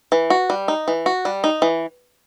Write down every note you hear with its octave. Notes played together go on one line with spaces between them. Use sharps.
E3
F#4
G3
D#4
E3
F#4
G3
D#4
E3